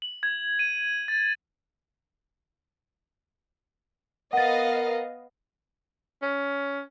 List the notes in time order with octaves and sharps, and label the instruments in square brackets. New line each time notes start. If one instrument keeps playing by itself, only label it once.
[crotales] F#7
G#6
D#7
A6
[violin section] B3 D#5 F5 [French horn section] A#4 [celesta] F#5 A6
[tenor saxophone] C#4